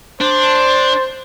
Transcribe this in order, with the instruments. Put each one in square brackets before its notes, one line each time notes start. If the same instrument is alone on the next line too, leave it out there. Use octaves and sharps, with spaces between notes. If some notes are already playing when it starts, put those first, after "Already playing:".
[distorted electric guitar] D4 [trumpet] C5